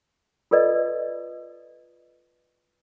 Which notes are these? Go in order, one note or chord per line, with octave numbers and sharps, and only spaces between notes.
F4 A4 B4 D5 D#5